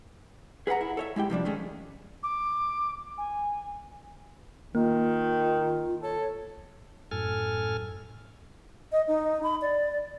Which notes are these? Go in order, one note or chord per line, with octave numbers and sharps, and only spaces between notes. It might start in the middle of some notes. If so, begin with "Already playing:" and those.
G#4 B4 F5 F#5 A#5
E4
A4 C#5 E5
G#3 E4 G4 G5
C3 F3 G3 D4
D#3 G#3 A3 C#4
D6
G#5
D#3 A#3 F4
A4 C#5
F#2 A2 A4 G#5 F6
D#5
D#4
B5
D5